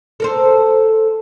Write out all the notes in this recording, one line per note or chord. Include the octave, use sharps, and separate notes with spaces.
A4 A#4 C5